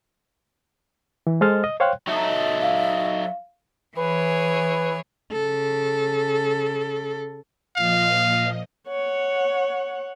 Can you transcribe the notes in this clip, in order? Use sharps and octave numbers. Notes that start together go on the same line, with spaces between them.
E3
G#3 A4 C5 D#5 F6 A6
D#5
C5 C#5 F5 G5 C6 F#6
F#3 D#4 A4 E5
F5
E3 G#4 B4 C#5
C#3 A4
A#2 F3 D#5 F5
C#5 F#5